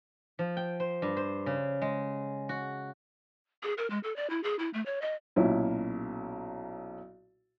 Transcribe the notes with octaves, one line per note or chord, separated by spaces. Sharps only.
F3
G5
C5
G2
C5
C#3
G#3
F#4
G#4
A#4
G#3
A4
D5
E4
G#4
E4
A3
C#5
D#5
B1 A#2 C#4 E4